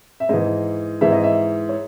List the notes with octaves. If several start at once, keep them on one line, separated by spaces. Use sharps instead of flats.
E5
G#2 E3 D#5
G#2 E3 E5
D#5
E5
C#5